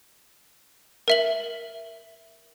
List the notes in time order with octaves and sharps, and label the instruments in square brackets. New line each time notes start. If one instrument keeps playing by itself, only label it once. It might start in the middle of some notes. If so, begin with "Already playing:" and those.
[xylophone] A#4 E5 F#7